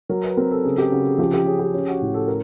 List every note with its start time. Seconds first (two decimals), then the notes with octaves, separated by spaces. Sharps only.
0.09 F#3 A#4
0.24 B4
0.37 C4 A#4
0.51 A4
0.64 C#3 G#4
0.78 G4
0.92 C#3 F#4
1.06 G#4
1.19 F3 G4
1.33 G4
1.46 C#4 G#4
1.59 G4
1.74 C#4
1.88 F#4
2.02 A2
2.14 A4
2.28 A#4